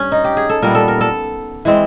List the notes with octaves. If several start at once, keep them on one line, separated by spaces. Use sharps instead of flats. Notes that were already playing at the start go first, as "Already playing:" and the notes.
Already playing: G2 C#4
D#4
G4
G#4
A4
A#2 G3 B3 A#4
A4
A#4
A4
E3 G#3 C4